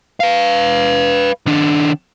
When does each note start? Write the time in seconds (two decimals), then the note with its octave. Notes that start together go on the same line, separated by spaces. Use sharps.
0.20 B4 F5
1.46 D#3 D4